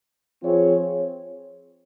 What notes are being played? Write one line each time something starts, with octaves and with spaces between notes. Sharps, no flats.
F3 C4 F4 G#4 C#5